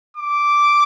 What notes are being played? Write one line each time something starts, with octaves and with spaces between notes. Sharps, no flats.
D6